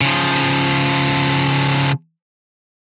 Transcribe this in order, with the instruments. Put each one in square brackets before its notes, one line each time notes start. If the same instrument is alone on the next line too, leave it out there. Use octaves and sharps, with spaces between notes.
[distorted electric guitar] C#3 F3